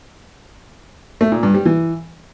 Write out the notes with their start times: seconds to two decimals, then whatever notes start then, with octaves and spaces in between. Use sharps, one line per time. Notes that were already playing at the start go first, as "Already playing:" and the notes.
1.21 A3
1.32 A#2
1.43 G2
1.54 G3
1.66 E3